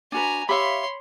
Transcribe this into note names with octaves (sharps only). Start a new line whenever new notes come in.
D4 F#4 B4 G#5 A#5
G4 C#5 E5 F5 B5 C6